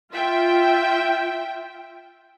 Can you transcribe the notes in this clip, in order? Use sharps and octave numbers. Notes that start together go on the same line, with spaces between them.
F4 E5 G5